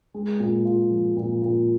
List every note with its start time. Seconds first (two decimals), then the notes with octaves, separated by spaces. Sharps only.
0.14 G#3
0.40 A#2
0.65 F4
0.91 F3
1.16 A#2
1.42 A#2